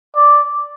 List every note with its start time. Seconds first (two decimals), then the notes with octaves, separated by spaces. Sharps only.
0.15 D5